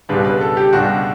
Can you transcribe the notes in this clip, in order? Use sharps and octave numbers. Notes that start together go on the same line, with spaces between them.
C#2 B2 G3 D4 B4
B4
A4
G4
C#2 B2 G3 D4 F#4